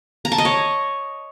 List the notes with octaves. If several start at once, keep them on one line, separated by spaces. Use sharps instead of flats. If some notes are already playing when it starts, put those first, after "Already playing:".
A#5
A5
D#5
C#5